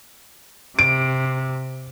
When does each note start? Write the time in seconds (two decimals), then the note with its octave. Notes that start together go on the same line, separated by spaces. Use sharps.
0.79 C3 D7